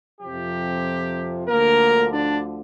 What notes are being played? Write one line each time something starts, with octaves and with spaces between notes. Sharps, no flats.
F2 C3 F3 G4
D2 D3 F3 A#3 A#4
D4 D5